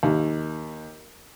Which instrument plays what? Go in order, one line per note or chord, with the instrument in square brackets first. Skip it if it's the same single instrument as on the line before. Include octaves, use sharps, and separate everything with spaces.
[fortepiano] D#2